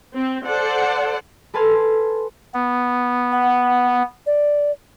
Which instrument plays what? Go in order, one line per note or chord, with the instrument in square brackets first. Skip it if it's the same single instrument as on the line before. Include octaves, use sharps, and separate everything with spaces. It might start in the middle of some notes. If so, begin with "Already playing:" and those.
[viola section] C4
A4 C5 D5 F#5
[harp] A4 B4 G#5 A5 C6 F6
[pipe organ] B3
[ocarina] F#5
D5